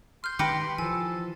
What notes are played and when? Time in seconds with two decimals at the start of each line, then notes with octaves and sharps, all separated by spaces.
0.24 C6 F6 G6
0.39 D#3 G4 B4 A#6 C#7
0.78 E3 F3 A4 G#5